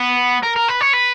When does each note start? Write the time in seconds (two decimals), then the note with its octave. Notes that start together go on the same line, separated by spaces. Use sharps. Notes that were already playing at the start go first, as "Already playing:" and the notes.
Already playing: B3
0.43 A#4
0.56 A#4
0.68 B4
0.81 C#5
0.93 B4